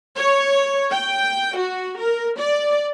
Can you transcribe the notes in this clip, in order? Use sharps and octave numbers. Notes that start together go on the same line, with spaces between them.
C#5
G5
F#4
A#4
D5